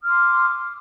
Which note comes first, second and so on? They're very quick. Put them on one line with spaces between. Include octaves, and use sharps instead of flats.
D#6 F6 C6 D6